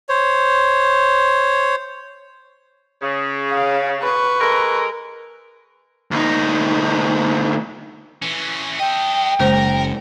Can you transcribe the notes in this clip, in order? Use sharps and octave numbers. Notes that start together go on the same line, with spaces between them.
C5 C#5
C#3
F5
B4 C#6
G#3 A4 A#4
D2 D#4
E3 C#4
A4 D#5 G5
F#1 C#3 G#3 A#4 C5